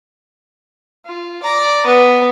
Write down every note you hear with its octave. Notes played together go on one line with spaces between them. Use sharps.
F4
D5 A#5
B3 B4